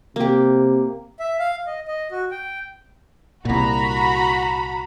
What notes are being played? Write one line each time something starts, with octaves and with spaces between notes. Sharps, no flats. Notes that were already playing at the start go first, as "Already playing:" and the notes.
C3 A#3 G4
E5
F5
D#5
D#5
F#4
G5
C2 A#2 F#4 A#5 B5